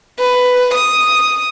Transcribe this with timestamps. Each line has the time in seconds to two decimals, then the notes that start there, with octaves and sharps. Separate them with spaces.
0.19 B4
0.74 D#6